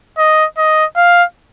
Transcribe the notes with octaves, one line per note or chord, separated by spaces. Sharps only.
D#5
D#5
F5